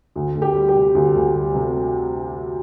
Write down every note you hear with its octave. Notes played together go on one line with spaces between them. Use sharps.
D2
D2
G4
G3
G4
C3
D2
D2
G3
C3